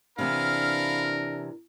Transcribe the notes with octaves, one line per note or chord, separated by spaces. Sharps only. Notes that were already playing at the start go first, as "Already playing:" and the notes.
C3 E3 B3 D4 A#4 F5 B5 F6